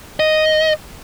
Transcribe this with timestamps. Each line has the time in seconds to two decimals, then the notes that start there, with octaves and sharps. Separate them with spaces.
0.20 D#5